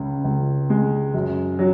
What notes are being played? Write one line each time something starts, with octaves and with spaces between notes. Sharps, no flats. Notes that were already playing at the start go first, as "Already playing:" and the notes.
Already playing: C#2 C#3
C#2
G#3
F#2
F#3